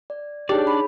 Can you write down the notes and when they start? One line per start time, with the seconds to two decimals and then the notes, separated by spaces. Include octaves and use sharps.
0.10 D5
0.49 D4 D#4 G4 G#4 C#5 D5
0.67 B5